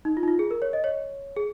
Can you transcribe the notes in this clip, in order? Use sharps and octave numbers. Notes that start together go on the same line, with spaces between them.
D#4
F4
D#4
F4
G#4
A#4
C#5
D#5
C#5
G#4